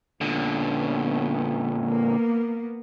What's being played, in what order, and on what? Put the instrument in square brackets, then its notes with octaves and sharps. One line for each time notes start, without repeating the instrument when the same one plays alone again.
[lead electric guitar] A#2 D3 [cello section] B3 C#4
[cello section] A#3 B3